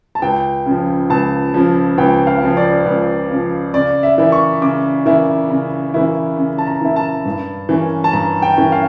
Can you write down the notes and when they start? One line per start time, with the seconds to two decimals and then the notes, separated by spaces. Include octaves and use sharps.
0.15 A5
0.22 C#2 G5
0.66 C#3
0.71 F3
1.10 C#2 A5
1.54 C#3 F3
1.98 C#2 G5
2.27 F5
2.42 C#3 F3
2.57 D5
2.86 C#2
3.31 C#3 F3
3.74 C#3 D5
4.03 E5
4.18 E3 A#3 E4
4.32 C#6
4.62 C#3 D6
5.06 E3 A#3 E4
5.50 C#3
5.94 E3 A#3 E4
6.37 C#3
6.58 A5
6.67 A#5
6.81 E3 A#3 E4
6.96 A5
7.26 G2
7.69 E3 A#3 C#4
8.04 A5
8.13 G2 A#5
8.42 G5
8.57 E3 A#3 C#4
8.72 F5